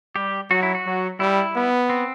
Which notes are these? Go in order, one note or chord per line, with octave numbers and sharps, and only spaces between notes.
G3 G4
F#3 F#4
E4
F#4
F#3
G3 E4
B3
C4